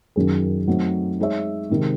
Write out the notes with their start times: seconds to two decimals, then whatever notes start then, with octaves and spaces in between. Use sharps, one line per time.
0.16 F#2 D#3 F#3 C#4 G#4
0.68 F#3 A3 C4 D#4 F#4
1.19 G#3 D#4 G#4 C#5 E5
1.69 C3 D#3 G#3